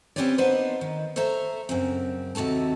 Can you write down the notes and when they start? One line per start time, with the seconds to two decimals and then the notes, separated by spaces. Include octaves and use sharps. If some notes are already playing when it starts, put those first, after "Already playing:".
0.16 C4 C#4 G4 B4 C#5 D5
0.38 B3 D4 D#4 B4 C5
0.81 D#3
1.16 A4 C5 C#5 E5 A#5
1.69 F#2 C#3 C4
2.35 D#2 C3 F#4 A4 A5